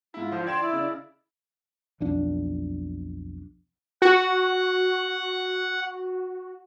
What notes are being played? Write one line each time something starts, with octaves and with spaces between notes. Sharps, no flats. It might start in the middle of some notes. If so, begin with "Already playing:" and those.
G#2 E4 F4
D3 F3 C5
D5 G5 C6 G#6 E7
E4
C#3 D#5
B1 F2 D4
F#4 F#5